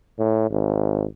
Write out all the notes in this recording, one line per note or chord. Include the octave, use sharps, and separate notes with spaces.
A2
G#1